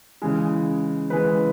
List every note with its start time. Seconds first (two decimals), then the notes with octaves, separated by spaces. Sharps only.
0.22 C#3 E3 G#3
1.10 C#3 E3 G#3 B4